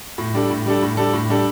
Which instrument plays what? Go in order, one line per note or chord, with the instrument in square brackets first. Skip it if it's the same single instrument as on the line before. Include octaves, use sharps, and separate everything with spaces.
[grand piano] A2
G3 D4 A4
A2
G3 D4 A4
A2
G3 D4 A4
A2
G3 D4 A4